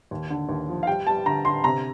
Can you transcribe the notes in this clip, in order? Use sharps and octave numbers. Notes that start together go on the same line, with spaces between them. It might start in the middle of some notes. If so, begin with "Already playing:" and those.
D#2
D3
D#2
F3
F5
G3 G5
G3 A5
D3 A#5
D3 C6
C3 A#5